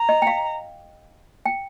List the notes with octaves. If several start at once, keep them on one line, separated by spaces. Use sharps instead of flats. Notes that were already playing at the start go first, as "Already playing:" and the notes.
Already playing: A#5
D#5
G5
F5
G5